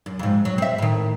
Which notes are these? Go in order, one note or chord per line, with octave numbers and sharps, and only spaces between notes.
F#2
F2 G#2
F#3
C4 E5
A2 D#3